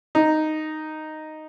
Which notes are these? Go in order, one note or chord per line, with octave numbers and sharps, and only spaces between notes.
D#4